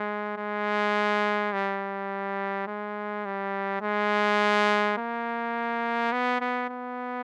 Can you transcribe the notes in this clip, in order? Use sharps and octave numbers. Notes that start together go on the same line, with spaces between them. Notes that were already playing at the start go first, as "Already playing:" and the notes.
Already playing: G#3
G#3
G3
G#3
G3
G#3
A#3
B3
B3
B3